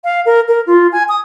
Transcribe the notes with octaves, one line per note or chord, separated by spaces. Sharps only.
F5
A#4
A#4
F4
G#5
D#6